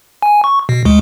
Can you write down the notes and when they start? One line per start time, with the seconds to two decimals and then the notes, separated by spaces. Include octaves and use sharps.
0.22 G#5
0.44 C#6
0.69 B2
0.85 D2 G#3